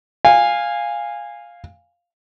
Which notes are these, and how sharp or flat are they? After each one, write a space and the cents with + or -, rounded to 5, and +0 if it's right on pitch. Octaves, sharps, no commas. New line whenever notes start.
F5 +0 G#5 -15